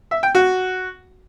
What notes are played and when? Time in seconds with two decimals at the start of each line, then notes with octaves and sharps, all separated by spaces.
0.11 E5
0.23 G5
0.35 F#4